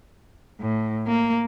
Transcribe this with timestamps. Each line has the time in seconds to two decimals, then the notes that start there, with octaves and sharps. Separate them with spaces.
0.60 A2
1.07 A#3